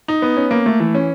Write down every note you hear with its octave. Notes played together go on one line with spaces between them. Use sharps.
D#4
B3
C#4
A#3
A3
E3
C#4